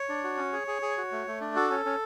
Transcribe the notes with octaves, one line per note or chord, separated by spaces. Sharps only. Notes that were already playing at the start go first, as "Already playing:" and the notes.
Already playing: C#5
D4
F#4
C#4
G#4
G#4
G#4
F#4
A3
A3
D4
F#4 A4
C#4
C#4